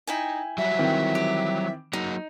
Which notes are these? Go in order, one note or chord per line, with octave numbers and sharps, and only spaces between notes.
D#4 E4 G5 G#5
F#3 G3 F#4 E5
D#3 E3 C4
G4
F#3 A#3 D#4 F#4